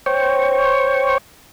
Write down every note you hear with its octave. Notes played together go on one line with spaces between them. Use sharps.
C5 C#5 G5 C#6